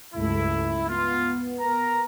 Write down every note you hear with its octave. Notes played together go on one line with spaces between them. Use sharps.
C#2 G2 A3 E4
B3 F4
A#4 A#5